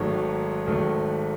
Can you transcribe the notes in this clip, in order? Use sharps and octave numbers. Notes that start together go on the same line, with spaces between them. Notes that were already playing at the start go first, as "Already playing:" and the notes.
Already playing: G#1 G#2 D#3 F#3 A3
G#1 G#2 D#3 F#3 A3